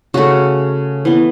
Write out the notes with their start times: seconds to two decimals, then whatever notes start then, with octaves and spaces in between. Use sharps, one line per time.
0.14 C#3 A3 F#4
1.05 E3 B3